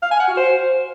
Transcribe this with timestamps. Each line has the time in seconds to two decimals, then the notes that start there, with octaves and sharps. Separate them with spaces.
0.02 F5
0.11 G#5
0.20 F#5
0.28 F#4
0.37 C5